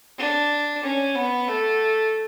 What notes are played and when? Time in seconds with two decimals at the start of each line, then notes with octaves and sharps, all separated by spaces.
0.18 D4
0.83 C#4
1.15 B3
1.48 A3